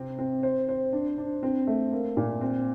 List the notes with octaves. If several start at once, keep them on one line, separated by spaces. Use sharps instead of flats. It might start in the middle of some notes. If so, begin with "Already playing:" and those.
Already playing: C3 C4
C4
C5
C5
D4
D4
C4
A3
A#3
A#2
C4